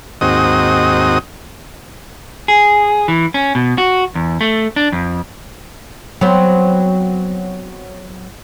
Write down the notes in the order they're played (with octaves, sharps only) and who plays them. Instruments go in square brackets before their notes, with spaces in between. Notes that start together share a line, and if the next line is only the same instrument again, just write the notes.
[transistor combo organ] D#2 G#2 C4 F#4 D#5 D#6
[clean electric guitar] G#4
E3
C#4
B2
F#4
E2
A3
D4
F2
[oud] F#3 B3 C4